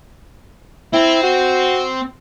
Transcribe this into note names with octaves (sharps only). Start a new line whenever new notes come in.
C4 E4
F#4